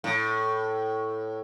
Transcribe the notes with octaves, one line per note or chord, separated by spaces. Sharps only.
A2